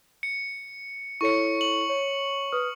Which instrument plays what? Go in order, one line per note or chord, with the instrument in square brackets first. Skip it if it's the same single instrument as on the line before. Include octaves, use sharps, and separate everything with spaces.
[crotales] C#7
[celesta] E4 A4 C#5 [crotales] C#6 C#7
[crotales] F#7
[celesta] C#5
B4 D#6 F6